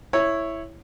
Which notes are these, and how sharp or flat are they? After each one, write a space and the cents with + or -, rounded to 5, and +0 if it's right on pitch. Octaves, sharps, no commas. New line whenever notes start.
E4 +0 C#5 -5